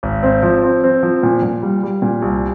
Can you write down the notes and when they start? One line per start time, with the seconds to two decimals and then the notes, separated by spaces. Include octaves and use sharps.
0.03 G#1
0.23 C4
0.43 F3
0.63 C4
0.84 C4
1.03 F3
1.23 A#2
1.42 A#2
1.63 G3
1.83 G3
2.02 A#2
2.22 C2